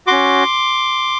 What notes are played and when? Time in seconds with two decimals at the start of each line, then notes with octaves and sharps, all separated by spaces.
0.07 C#4 F#4 C6 D6